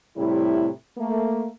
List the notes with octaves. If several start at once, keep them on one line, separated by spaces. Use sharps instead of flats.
A2 C3 G3 E4
A3 A#3